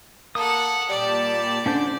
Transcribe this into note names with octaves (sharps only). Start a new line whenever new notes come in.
A#3 A4 F#5 D#6
A#2 G3 G4 D5 A5
D3 C#4 D4 C5